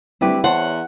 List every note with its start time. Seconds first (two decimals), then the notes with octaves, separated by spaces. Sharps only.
0.21 D2 G3 C4 E4 G4 B4
0.44 E2 C5 C#5 F#5 A5